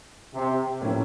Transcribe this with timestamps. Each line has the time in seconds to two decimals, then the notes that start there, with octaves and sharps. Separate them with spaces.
0.34 C3
0.81 A2 F3 A#3 C#4 E4